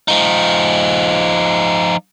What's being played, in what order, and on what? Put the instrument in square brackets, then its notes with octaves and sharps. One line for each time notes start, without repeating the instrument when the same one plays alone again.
[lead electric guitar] F3 D#4